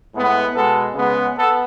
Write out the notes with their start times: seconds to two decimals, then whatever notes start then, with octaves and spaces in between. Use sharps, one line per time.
0.13 A2 G#3 B3
0.53 B2 G#3 B3 A4
0.94 C#3 G#3 B3
1.36 B3 A4